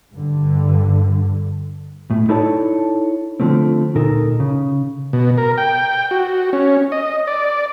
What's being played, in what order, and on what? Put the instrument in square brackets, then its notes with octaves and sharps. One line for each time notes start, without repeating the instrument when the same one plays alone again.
[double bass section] G2 D3
[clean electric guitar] A2
D#4 E4 A4 C#5 D5 A5
D3 F3 A3 C4
D2 A#2 D#4 A4 A#4
C#3
[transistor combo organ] B2
A#4
G5
F#4
C#4
D#5
D5